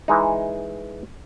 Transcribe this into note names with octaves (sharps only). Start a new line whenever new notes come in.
E3 G#3 D#4